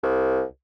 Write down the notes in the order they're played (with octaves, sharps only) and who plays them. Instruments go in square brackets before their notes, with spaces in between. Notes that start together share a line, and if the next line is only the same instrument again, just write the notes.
[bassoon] C2